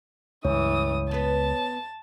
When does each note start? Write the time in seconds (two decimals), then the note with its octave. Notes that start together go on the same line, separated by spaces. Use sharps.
0.45 C#2 G2 E3 C#5 D#6
1.11 B3 B4 A5